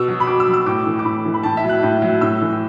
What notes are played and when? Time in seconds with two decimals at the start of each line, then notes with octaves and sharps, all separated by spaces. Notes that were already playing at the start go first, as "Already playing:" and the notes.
Already playing: B2 E6
0.08 F#3
0.20 B5
0.27 B2 D6
0.40 E6
0.47 F#3
0.53 E6
0.66 A2 D6
0.86 E3
0.99 D6
1.04 A2 B5
1.25 E3
1.34 B5
1.43 A2 A5
1.57 E5
1.63 F#3
1.69 F#6
1.83 A2
2.02 F#3
2.21 A2 E6
2.41 E3